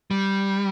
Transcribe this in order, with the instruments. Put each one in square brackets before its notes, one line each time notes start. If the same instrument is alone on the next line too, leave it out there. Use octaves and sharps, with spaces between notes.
[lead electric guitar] G3